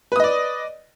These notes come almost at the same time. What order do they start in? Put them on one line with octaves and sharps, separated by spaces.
B4 D#6 D#5 D5